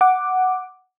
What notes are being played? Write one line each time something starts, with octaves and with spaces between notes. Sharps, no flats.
F#5 D6